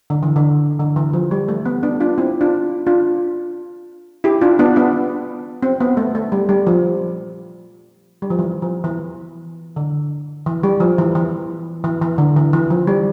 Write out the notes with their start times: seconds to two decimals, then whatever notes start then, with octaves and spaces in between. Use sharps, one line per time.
0.10 D3
0.23 E3
0.36 D3
0.80 D3
0.96 E3
1.13 F3
1.31 G3
1.48 A3
1.66 B3
1.83 B3 D4
2.00 D4 F4
2.18 C4 E4
2.41 D4 F4
2.87 D4 F4
4.24 E4 G4
4.41 D4 F4
4.59 B3 D4
4.76 B3 D4
5.63 C4
5.81 B3
5.97 A3
6.15 A3
6.32 G3
6.49 G3
6.67 F3
8.22 G3
8.30 F3
8.39 E3
8.62 F3
8.84 E3
9.76 D3
10.46 E3
10.63 G3
10.80 F3
10.98 E3
11.15 E3
11.84 E3
12.02 E3
12.18 D3
12.36 E3
12.53 E3
12.70 F3
12.87 G3